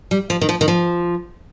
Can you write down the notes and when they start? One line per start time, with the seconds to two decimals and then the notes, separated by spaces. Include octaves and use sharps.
0.11 G3
0.30 F3
0.42 D#3
0.49 F3
0.61 D#3
0.68 F3